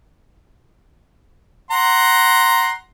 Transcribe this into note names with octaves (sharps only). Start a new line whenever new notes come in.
F#5 A#5 C6